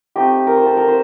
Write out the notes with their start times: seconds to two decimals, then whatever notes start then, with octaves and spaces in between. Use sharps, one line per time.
0.16 A3 C4 D#4 G4
0.47 A#4
0.56 C5
0.66 A4
0.77 A#4
0.88 C5